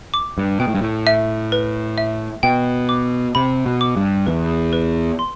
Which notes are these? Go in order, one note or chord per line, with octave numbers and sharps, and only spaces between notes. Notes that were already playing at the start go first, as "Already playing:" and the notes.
D6
G2
B2 G5
A2
G2
A2
E5
B4
E5
B2 G5
D6
C3 B5
B2
D6
G2
E2 B4
B4
C6